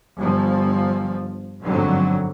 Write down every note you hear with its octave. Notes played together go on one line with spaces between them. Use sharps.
G1 F3
G1 F2 G#2 D3 F#3